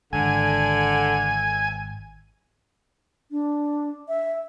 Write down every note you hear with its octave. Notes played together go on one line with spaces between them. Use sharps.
G#1 D3 G#5
D4
E5